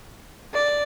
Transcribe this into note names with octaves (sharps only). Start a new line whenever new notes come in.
D5